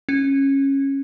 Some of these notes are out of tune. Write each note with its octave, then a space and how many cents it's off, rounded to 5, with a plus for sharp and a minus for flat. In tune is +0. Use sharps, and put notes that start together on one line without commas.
C#4 -15